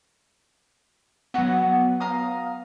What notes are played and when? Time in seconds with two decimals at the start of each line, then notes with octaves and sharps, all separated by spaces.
1.34 F#3 B3 F#4 F#5
2.00 F5 A#5 D#6